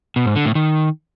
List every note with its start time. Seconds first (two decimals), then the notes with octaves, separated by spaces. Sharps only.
0.16 B2
0.26 G#2
0.36 D3
0.46 A2
0.55 D#3